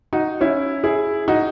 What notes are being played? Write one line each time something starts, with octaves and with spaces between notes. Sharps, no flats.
D#4 F#4
C#4 E4
E4 G#4
D#4 F#4